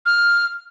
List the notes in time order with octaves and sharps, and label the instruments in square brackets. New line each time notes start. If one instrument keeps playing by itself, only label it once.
[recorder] F6